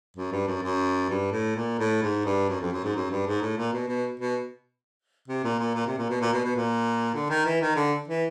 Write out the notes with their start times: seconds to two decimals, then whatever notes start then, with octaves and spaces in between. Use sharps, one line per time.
0.17 F#2
0.32 G2
0.47 F#2
0.63 F#2
1.10 G2
1.32 A2
1.56 A#2
1.79 A2
2.02 G#2
2.26 G2
2.49 F#2
2.61 F2
2.72 F#2
2.84 G#2
2.96 F#2
3.11 G2
3.26 G#2
3.42 A2
3.57 A#2
3.73 B2
3.89 B2
4.19 B2
5.28 C3
5.44 A#2
5.59 A#2
5.75 A#2
5.86 C3
5.98 A#2
6.10 B2
6.21 A#2
6.33 B2
6.44 B2
6.56 A#2
7.14 D3
7.30 D#3
7.46 E3
7.61 D#3
7.76 D3
8.08 E3